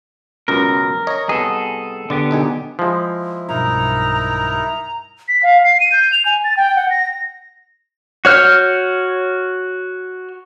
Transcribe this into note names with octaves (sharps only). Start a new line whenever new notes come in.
C#2 F#2 B2 A#4
C#5 D#5 A#5
C2 B3 G#4 A4 D#5
D3 B3 G4 D5
B1 D#4 G#4
F3 G#3 E4
B1 G2 D#4 E4 A#4 A#5
B6
F5
C7
D#7
G6
F7
G#5
A6
G5
F#5
A#6
F#4 C#5 F6 G6